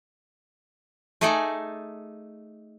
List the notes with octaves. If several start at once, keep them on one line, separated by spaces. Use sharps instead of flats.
A3 D#4 G#4 A4 D5 G#5